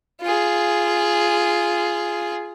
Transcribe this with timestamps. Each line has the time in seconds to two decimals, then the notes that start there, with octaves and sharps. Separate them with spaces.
0.22 F4 G#4